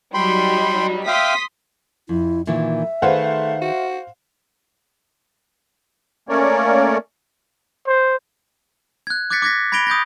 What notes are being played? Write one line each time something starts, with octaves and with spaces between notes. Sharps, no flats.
F#3 G3 D#4 G5 B5 C6
E5 F5 G5 C6 D#6 B6
F2 E4
A#2 D#3 E3 E5
D#3 A3 G#4 B4 C5 F5 F#5
F#4
A3 A#3 C#4 A#4 C#5 D5
C5
F#6 G#6
D6 F#6 G#6 A6 B6 C#7
D6 F#6 G#6 A#6 B6
B5 G#6 A#6 D7 F7 G7
D#6 G6 G#6 A#6